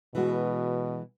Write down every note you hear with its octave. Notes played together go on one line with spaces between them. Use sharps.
B2 E3 G#3 F#4